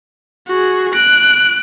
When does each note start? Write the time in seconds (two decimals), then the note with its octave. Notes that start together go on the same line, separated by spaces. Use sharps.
0.48 F#4 G#4
0.94 F#6 D7